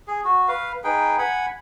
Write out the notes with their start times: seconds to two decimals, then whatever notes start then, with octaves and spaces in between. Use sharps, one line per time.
0.08 G#4
0.25 F#4
0.48 B4 F5
0.84 D#4 G#4 B4 G5
1.18 F#5 G#5 B5